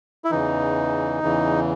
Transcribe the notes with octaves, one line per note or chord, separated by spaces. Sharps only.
E4
E2 C#3 E3 D#4
E2 C#3 E3